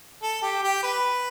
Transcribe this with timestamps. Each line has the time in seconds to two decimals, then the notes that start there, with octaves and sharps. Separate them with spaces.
0.22 A4
0.42 G4
0.63 G4
0.83 B4